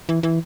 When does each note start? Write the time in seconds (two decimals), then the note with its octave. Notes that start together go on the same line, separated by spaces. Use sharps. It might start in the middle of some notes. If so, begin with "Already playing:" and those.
0.09 E3
0.23 E3